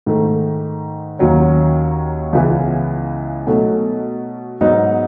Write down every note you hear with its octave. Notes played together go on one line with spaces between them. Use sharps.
G#2 D#3 A3
D#2 D#3 F#3 C#4
C#2 C#3 E3 B3 E4
B2 F#3 A3 D#4
G#2 F#3 B3 D#4